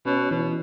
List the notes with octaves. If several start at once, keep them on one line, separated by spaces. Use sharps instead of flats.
B2 C#4
B2 E3